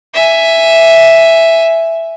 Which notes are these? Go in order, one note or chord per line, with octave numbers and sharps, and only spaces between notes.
E5 G#5